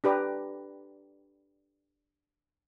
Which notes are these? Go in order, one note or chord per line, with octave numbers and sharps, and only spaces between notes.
D4 G4 B4 D5 A#5